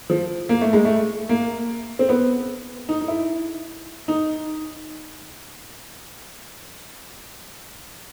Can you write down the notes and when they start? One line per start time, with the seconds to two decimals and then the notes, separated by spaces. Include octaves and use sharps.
0.10 F3
0.49 A#3
0.61 A3
0.73 G#3
0.85 A3
1.29 A#3
1.99 C4
2.09 B3
2.89 D#4
3.01 D#4
3.08 E4
4.08 D#4